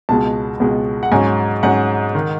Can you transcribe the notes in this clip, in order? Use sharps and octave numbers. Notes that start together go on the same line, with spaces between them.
C#2 B2 G#3 A5
C#2 B2 G#3
F#5
G#2 F#3 C#4 G#5
G#2 F#3 C#4 F#5
D#3